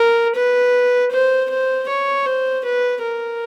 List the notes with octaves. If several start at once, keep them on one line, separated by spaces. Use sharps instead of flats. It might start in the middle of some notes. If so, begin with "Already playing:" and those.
Already playing: A#4
B4
C5
C5
C#5
C5
B4
A#4